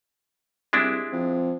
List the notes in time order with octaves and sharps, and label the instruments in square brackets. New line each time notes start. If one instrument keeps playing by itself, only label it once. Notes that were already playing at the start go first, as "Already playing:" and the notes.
[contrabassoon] C2 [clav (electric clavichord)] G#3 D4 E4
[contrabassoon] F2